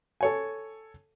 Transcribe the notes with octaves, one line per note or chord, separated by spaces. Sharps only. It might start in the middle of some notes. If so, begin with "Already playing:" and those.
A4 C#5 G#5